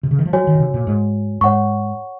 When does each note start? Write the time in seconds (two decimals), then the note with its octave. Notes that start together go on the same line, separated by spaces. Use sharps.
0.03 C3
0.11 C#3
0.19 D#3
0.26 F3
0.33 F#3 F#4 C#5 G#5
0.47 D#3
0.55 A#2
0.60 C3
0.74 A#2
0.87 G#2
1.41 G#2 C#5 F#5 C#6